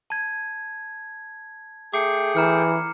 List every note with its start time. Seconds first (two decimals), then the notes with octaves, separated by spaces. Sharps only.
0.10 A5 G#6
1.94 A3 G#4 G5 D6 C7 C#7
2.35 E3 A#5 F6 C#7